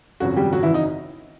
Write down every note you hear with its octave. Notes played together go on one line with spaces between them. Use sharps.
G#1 F#2 C#3 F3 F#3 F#4
G3 G4
F#3 F#4
E3 E4
D#4